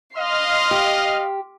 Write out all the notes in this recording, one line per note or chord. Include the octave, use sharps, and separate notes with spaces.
D#5 F5 C6 F6
G4